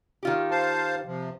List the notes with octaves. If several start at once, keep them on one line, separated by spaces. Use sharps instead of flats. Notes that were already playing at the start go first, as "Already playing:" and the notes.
D#3 F4 G4
C5 F5 A5
C3 F3